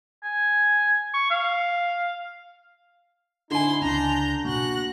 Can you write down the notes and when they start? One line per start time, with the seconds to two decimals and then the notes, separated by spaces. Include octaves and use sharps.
0.23 G#5
1.14 C#6
1.30 F5
3.50 D3 D#4 E4 G#5 C6
3.82 C#2 C#4 D4 A#5 G6
4.45 B2 A#3 F#4 F#6 A#6